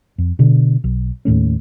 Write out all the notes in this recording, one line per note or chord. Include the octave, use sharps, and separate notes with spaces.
F2
B2 D3
B1
D#2 A2 A3 C#4